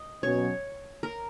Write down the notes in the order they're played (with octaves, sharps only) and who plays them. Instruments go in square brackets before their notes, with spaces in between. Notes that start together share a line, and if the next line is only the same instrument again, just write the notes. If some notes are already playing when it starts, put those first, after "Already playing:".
Already playing: [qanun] D#5
[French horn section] B2 F#3 C#4 [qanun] C#5
[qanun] A#4